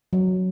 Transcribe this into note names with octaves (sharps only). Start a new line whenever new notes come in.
F#3